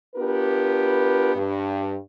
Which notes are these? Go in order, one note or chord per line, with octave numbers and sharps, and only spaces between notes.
B3 D4 F4 G4 A#4 B4
G2